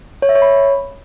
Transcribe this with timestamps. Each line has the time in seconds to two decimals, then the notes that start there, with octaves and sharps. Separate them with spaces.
0.22 C#5
0.29 E5
0.35 C#5
0.42 B5